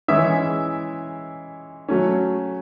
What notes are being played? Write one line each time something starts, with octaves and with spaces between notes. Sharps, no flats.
E3 G#3 C#4 E4 E5
F#3 A3 C#4